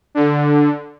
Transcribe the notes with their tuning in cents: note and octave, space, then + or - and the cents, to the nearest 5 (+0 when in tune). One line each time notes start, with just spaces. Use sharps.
D3 +0